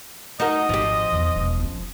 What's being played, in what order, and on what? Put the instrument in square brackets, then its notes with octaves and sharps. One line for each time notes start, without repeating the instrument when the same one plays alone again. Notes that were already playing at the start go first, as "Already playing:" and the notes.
[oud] D#4 F#4 A#4 [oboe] D#5
[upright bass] G#1 [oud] F3 G4
[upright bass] E2 D#3
E1
B3 C#4